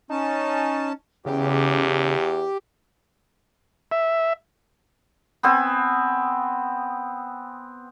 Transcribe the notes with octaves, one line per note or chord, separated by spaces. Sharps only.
C#4 D#4 A5
E2 C#3 G4
E5
B3 C4 G#5